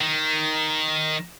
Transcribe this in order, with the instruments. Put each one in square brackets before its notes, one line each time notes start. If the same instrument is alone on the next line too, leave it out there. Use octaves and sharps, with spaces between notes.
[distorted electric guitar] D#3